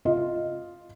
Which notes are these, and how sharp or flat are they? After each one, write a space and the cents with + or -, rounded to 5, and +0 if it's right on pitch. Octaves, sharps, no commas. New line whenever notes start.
F4 +0 D#5 +0